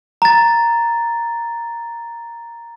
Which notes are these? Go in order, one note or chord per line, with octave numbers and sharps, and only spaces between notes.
A#5 A6